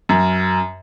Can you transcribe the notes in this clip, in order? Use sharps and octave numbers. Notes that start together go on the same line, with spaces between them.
F#2